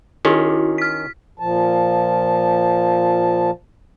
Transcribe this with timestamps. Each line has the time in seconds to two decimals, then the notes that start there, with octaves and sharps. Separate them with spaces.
0.25 D#3 C#4 E4 F#4
0.78 F6 B6
1.39 A#2 F3 A5